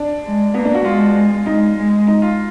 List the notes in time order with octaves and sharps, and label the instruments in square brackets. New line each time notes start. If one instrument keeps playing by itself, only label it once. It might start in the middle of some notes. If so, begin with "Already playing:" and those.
Already playing: [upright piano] D4
[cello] G#3
[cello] A#3 [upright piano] B3
[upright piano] D4
F#4
[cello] G#3 [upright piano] F4
[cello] G#3 [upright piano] D#4
[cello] G#3
[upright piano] D#4
F4